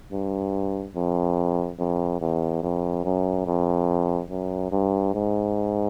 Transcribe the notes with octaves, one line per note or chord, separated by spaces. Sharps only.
G2
F2
F2
E2
F2
F#2
F2
F#2
G2
G#2